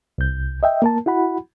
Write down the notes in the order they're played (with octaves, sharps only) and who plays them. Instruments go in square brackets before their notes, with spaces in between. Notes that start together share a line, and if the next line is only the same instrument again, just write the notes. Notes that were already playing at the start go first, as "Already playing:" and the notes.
[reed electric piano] C2 G6
D#5 E5 G5
A#3 A#4 A5
E4 F#4 F#5 B5